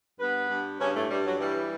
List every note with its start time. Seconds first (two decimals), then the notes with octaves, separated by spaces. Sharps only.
0.18 G2 B3 B4
0.49 G2
0.79 G2 C#3 C#4
0.94 A2 A3
1.09 G2 G3
1.24 F#3
1.39 E3 G3